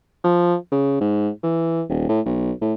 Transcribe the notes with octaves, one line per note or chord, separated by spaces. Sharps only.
F3
C#3
G#2
E3
D#1
A2
B1
A2